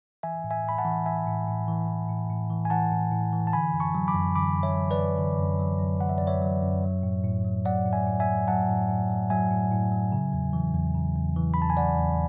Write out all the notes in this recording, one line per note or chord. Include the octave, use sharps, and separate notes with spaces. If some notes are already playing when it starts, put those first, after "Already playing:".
E3 E5 G#5
A2
E5 G#5
A2 B5
F#5 A5
E3
E3 E5 G#5
A2
A2
E3
E3
A2
A2
E3
G#5
E3 F#5 A5
A2
A2
E3
A5
D3 G#5 B5
F#2
A5 C#6
F#3
B5 D6
F#2
D3 B5 D6
F#2
C#5 E5
F#3
B4 D5
F#2
D3
F#2
F#3
F#2
D3 F#5
E5
F#2 D5
C#5 E5
F#3
F#2
F#3
A2
A2
F#3
F#3 D5 F#5
A2
E5 G#5
A2
E5 G#5
F#3
F#3 F#5 A5
A2
A2
F#3
F#3 E5 G#5
A2
A2
F#3
C#3
E2
E3
E2
C#3
E2
E3
E2 B5
A5
G#5
C#3 D5 F#5
E2